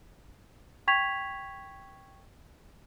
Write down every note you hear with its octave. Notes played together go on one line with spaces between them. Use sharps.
G5 C#6 G#6 B6 F7